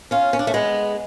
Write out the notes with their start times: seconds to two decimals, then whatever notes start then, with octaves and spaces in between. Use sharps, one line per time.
0.11 C#4 F4
0.33 C#4
0.39 D4
0.47 A3 C#4
0.54 G#3 B3